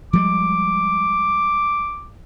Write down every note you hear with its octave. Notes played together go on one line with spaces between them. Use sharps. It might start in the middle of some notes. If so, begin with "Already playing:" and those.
F3 G3 G#3 D6